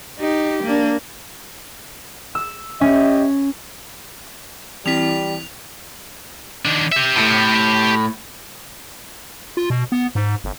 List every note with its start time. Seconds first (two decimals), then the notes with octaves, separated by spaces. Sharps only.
0.19 D#4 G4
0.64 A#3 D4
2.35 E6
2.81 C#4 G4 D#5 E5
4.86 E3 G3 C4 E4 B6 F7
6.65 D#3 D4
6.92 G4 E5
7.17 A2
9.57 F4
9.70 B2
9.92 B3
10.15 G#2
10.44 G1